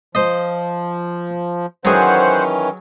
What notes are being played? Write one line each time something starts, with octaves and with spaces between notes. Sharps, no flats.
F3 C5 D#5
D#3 E3 F#3 C#4 G#4 C5 F#5